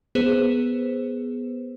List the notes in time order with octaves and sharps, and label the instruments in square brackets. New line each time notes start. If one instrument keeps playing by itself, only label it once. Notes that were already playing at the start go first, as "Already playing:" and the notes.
[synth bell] B3 G#4 B4 C5 E7